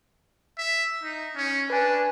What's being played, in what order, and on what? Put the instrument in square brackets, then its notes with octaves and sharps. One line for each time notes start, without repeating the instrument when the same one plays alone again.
[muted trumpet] E5
D#4
C#4
[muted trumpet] D4 [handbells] B4 G#5